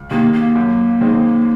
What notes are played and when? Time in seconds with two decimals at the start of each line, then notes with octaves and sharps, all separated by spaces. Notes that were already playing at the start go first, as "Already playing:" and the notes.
Already playing: C#2
0.11 C3 D#3 A#3
0.33 A#3
0.56 F#2
1.01 D#3 G#3 C4 D#4